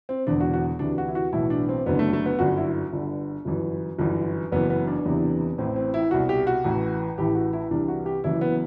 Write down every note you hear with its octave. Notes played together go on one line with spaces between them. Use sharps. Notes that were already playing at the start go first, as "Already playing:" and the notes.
C4
E1 E2 D3 D4
F#4
F#4
D2 C3 E3 D4
F#4
E4
F#4
B1 A2 E3 E4
D4
C4
F#1 F#2 D3 B3
A3
A3
B3
G1 F#2 D3 F#4
E4
G1 G2 D3
G1 F#2 E3
G1 F#2 E3
F#1 F#2 E3 B3
B3
D4
F#1 E2 C3 E3
A1 A2 E3 C4
C4
E4
C2 B2 F#4
G4
F#4
A1 A2 E3
A1 A2 E3 G4
F#4
E4
C2 C3 E3 D4
F#4
G4
F#1 F#2 E3 E4
B3